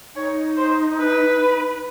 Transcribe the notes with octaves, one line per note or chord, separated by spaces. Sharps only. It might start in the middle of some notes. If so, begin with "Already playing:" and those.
D#4 C#5
C5
B4